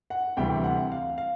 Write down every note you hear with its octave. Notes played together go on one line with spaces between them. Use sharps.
F#5
D2 C3 E3 G3 G5
F#5
F5
F5